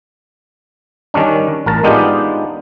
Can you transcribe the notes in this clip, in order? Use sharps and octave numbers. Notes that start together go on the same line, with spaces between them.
D#3 G3 C#4 D4
A1 A#4 A5
G#3 B3 D4 D#4 F4 G4